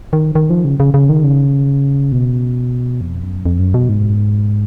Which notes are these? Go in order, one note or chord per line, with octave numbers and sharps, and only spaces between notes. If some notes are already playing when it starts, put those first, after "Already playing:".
D#3
D#3
F3
C#3
C#3
C#3
D#3
C#3
B2
F2
F#2
F2
F#2
B2
G#2